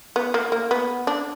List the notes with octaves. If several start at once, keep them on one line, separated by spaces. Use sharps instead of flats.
B3
A#3
A#3
B3
D4